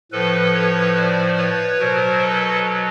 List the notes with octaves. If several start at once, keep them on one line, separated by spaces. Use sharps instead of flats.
A2 F3 A4 B4
B4 C#5
C5 D5
B4 C#5
B2 F#3 A#4 C5
A4 B4